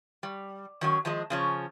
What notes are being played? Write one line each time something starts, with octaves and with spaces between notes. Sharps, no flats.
G3
D#3 F#3 C#4
D#3 F3 G#3 D#5
C#3 F3 C#4